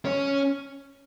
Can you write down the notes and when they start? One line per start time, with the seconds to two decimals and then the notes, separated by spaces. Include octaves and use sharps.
0.05 C#4